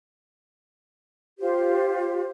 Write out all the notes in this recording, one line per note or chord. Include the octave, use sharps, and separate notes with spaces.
F4 G4 C5